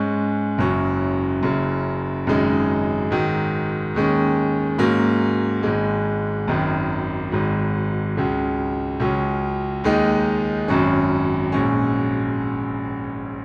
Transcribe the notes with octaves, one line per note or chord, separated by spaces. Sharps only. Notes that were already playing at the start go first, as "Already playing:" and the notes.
Already playing: G#2 G#3 C#4
F#1 F#2 F#3 C#4
F#1 F#2 C#3
G#1 F#2 C#3 G#3 D#4
G#2 D#3 F#3
D#2 D#3 G#3 C#4
G#2 F#3 A#3 C#4
G#1 G#2 G#3
G#1 F#2 D#3
G#1 G#2 F#3
C#2 C#3 F#3
C#2 C#3 F#3 C#4
D#2 D#3 G#3 D#4
G#1 F#2 F#3 C#4
A#1 G#2 F#3 C#4